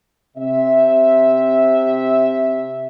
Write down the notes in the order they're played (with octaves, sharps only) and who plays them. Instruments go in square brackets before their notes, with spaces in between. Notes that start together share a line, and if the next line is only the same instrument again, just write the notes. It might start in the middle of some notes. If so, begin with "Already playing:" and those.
[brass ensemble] C3 E5